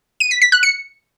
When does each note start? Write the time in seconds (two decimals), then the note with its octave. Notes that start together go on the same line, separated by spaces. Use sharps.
0.20 D#7
0.31 B6
0.42 B6
0.52 F#6
0.63 C#7